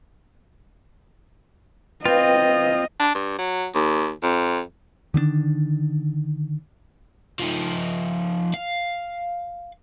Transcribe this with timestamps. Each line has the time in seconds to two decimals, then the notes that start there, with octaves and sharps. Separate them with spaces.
2.06 C4 F4 B4 D#5 F5 G5
3.00 D4
3.15 G2
3.39 F#3
3.75 D#2
4.23 F2
5.14 D3 D#3 A#3 D4
7.39 F3 D#4
8.54 F5